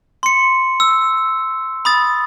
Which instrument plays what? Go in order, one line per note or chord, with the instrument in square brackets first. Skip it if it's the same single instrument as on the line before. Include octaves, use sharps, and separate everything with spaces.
[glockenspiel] C6 C#7
E6
B5 D#6 A6